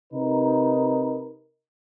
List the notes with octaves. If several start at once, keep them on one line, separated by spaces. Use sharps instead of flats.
C3 D#4 A#4 B4